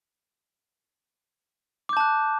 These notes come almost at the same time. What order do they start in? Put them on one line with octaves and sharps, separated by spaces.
D6 G6 A5 F#6